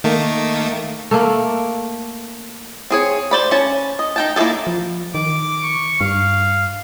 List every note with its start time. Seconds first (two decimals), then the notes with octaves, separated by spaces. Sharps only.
0.04 D#3 A3 A#3
1.11 A3 A#3
2.90 C4 G#4 C#5
3.31 C5 D5 B5
3.51 C#4 A5
3.99 D#5
4.16 D#4 G5 A5
4.36 A#3 E4 F4 G#4 A4
4.67 F3
5.14 D#3 D6
5.63 C#6
6.01 G2 F5